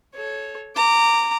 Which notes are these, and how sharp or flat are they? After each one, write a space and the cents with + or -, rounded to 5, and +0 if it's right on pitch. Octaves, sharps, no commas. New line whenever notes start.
A4 -25 C#5 +0
A#5 -20 D6 +0